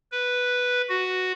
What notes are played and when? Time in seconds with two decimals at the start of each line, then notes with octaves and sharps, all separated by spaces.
0.12 B4
0.89 F#4